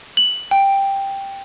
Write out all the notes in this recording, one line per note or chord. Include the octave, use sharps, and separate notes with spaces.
F#7
G5